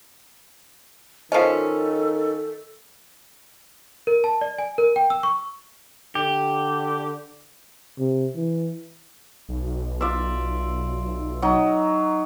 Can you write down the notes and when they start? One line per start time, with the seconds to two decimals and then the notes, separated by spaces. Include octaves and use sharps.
1.32 D#3 F3 C#4 A4 D#5 F5
4.07 A#4
4.24 A5
4.41 D5
4.58 G#5
4.78 A#4
4.96 G5
5.10 E6
5.23 C#6
6.15 D3 G4
7.98 C3
8.36 E3
9.49 B1
10.01 F4 D5 E5
11.42 F#3 D#4